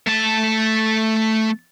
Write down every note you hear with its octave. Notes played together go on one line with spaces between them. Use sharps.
A3 A5